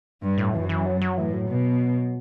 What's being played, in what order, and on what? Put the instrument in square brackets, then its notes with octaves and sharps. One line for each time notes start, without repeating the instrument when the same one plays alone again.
[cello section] G2
[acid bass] A2
[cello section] F#2 [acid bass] E3
[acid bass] E3
F#3
F#3
[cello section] A2 [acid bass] E3
[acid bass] F#3
[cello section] B2